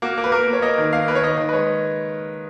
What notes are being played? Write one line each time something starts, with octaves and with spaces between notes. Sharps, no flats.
A#3 F#4
A#3
B4
A#3 A#4
A#3
C#5
A#3 D#5
D#3
A#3 F5
A#3 B4
C#5
D#3 D#5
D#3
B4
G#3 C#5